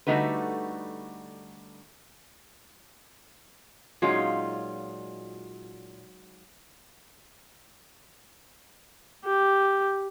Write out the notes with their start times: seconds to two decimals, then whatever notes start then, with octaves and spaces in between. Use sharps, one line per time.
0.07 D3 G3 A3 D#4 F#4 B4
4.02 A#2 F#3 G#3 C#4 D#4 F4
9.25 G4